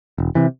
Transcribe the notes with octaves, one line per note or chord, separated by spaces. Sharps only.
E1
C3 E3